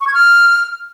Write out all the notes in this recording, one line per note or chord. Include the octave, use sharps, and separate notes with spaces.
C#6
G#6
F6